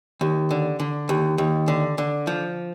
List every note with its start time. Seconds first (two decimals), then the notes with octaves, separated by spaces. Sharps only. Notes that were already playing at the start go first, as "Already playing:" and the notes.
0.21 D#2
0.51 D3
0.80 D3
1.09 D#2
1.38 D#2
1.68 D3
1.98 D3
2.27 F3